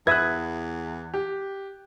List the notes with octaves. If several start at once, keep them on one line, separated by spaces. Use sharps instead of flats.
E2 B4 E5 D#6 F#6 G#6
G4